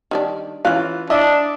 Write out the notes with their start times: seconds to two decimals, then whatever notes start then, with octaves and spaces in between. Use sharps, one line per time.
0.11 D#3 G3 D4
0.65 E3 C#4 F4 F5 F#6
1.10 D4 E4 D#5 E5